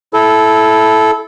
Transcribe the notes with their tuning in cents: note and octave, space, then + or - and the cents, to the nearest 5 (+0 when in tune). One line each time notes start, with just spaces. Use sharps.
E4 +0 A4 -15